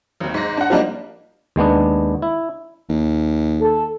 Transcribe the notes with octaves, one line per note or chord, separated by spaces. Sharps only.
G#1 D#2
G#2 A#6
D4 F#5
F3 G3 A#3 D4 D#4
D#2 G#3 B3 D4
E4
D#2
A4